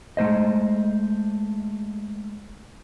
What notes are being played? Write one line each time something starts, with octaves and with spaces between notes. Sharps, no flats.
G#3 A3 C5 D#5